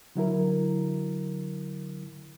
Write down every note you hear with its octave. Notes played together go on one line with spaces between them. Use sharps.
D3 F#3 E4 A#4